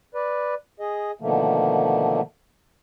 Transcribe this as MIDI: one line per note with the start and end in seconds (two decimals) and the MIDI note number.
0.15 0.54 71
0.15 0.54 74
0.80 1.11 68
0.80 1.11 75
1.21 2.21 47
1.21 2.21 50
1.21 2.21 51
1.21 2.21 53
1.21 2.21 57
1.21 2.21 58